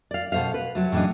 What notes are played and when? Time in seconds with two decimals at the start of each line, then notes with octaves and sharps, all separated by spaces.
0.11 D5 F5
0.32 B2 A4 C5 E5 F5
0.54 B4
0.75 C3 F#3 A3
0.92 A2 C#3 E3 D4 D#5